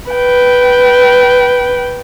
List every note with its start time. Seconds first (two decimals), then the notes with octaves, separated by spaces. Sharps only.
0.11 B4 G5